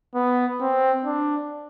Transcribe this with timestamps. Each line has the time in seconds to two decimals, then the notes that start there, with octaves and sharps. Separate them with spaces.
0.15 B3
0.61 C4
1.05 D4